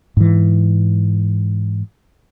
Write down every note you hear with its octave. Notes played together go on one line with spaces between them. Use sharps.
G#2 E3